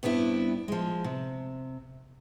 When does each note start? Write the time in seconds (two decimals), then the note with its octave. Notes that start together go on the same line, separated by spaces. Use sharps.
0.03 G2 B3 C4 D4 E4
0.68 F3 G#3
1.04 C3